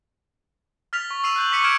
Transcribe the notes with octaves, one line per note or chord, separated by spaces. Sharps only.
F6 A6 B6 F7
C#6
E6 C7 D#7 F7
F#6 G6 F#7
C#6 D6 B6 C#7 D#7
F6 G#6 D7 E7